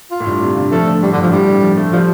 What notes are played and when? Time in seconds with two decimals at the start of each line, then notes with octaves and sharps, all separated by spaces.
0.11 F4
0.20 A2
0.27 G2
0.42 C3
0.57 D3
0.71 F3 A3
0.87 D3
1.03 A2 G3
1.12 D3
1.17 G2 F3
1.32 A2 G3
1.48 D3
1.63 F3
1.77 A3
1.92 F3 G3